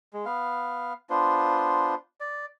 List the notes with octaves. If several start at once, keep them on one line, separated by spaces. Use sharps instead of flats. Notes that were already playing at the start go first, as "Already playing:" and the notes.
G#3
B3 F5
B3 D4 F4 C5
D5